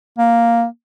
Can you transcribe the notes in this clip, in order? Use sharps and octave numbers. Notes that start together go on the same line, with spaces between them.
A#3